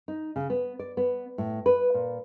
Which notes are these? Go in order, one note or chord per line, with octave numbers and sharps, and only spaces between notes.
D#4
C#3
B3
D5
B3
A2
B4
A#2